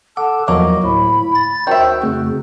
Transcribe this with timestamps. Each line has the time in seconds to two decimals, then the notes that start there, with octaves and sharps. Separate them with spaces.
0.17 A4 F#5 A5 D6
0.48 E2 F3 F#3 A#3 F#4 D#5 D6
0.84 D2 A2 B5
1.35 A6
1.67 D#3 F#4 C5 E5
2.03 F2 C#3 A3